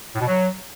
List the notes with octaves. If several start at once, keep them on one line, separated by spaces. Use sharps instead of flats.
A2
B2
F#3